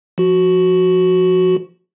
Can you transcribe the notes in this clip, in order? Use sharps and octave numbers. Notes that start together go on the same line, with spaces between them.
F3 F#4